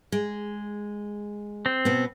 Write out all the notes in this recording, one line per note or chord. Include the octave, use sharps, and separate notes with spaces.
G#3
C4
B2 B3